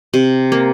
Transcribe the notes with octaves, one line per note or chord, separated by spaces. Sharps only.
C3
A#3